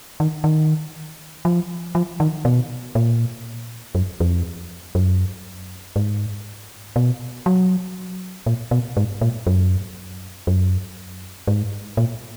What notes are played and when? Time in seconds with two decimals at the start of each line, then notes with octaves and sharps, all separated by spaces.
0.20 D#3
0.44 D#3
1.45 F3
1.95 F3
2.20 D#3
2.45 B2
2.95 A#2
3.95 F#2
4.20 F2
4.95 F#2
5.96 G#2
6.96 B2
7.46 F#3
8.46 A#2
8.71 B2
8.97 G#2
9.21 A#2
9.47 F#2
10.47 F#2
11.48 G#2
11.97 A#2